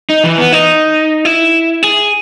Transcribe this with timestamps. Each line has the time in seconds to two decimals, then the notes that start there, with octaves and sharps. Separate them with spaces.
0.10 D#4
0.24 E3
0.38 B3
0.53 D#4
1.25 E4
1.83 G#4